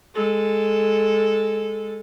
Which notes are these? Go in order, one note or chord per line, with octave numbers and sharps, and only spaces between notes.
G#3 A4